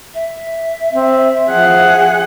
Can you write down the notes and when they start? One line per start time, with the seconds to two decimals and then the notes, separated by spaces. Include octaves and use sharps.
0.15 E5
0.93 C4
1.50 F3 G#4 F#5